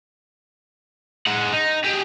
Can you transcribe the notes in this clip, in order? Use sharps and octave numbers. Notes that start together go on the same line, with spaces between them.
G#3 F#5
D#4
G4 G#4